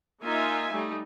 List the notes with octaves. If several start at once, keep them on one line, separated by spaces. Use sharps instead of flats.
A#3 D#4 F4 E5 G#5
G3 A3 D#4